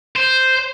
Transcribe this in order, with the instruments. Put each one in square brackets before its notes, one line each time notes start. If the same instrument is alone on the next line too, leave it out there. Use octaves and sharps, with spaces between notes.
[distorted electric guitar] C5